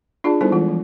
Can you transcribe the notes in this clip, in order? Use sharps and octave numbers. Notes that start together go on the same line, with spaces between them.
D4 F4 G#4 D5 A5
G3 B3 D#4 E4 A4 C5
E3 G#3 F4
F3